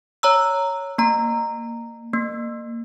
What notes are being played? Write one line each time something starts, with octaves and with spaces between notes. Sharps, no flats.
C#5 A#5 E6
A#3 A#5
A#3